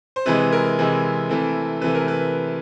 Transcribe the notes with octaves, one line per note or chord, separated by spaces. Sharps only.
C5
C3 E3 G#3 B4
A#4
C3 E3 G#3
C3 E3 A3
C3 E3 A3 B4
A#4
B4